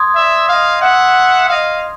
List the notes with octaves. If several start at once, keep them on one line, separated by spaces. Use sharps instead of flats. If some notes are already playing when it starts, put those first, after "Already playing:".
Already playing: C6 D#6 G#6
D5 E5
D#5 F5
E5 F#5
D#5 F5